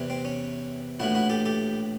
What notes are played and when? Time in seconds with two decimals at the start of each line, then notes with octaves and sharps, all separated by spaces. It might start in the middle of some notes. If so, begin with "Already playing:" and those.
Already playing: E2 C3 E3
0.10 C4
0.25 C#4
1.00 A#1 A2 E3 E4 F#4
1.15 E4 F#4
1.30 G4 A4
1.45 G4 A4